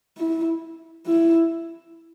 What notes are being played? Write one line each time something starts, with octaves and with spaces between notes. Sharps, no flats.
E4
E4